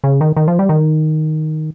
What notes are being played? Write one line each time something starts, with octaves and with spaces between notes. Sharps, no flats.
C#3
D#3
D#3
F3
G3
D#3